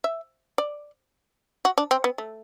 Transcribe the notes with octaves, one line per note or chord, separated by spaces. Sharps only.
E5
D5
F#4
D4
C4
B3
A3